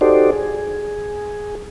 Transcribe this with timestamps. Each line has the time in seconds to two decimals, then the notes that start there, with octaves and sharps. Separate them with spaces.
0.01 D#4 F#4 G4 A4 C5 D5
0.32 G#4